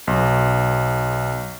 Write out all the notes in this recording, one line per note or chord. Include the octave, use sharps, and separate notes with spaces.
B1